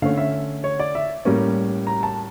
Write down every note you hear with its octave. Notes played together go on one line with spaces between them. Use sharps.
D3 A3 C#4 F5
E5
C#5
D5
E5
A2 G3 A#3 C#4
A#5
A5